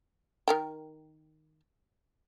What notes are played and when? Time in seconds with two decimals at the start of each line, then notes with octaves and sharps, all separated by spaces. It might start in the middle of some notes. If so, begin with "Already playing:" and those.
0.48 D#3 A#4 G5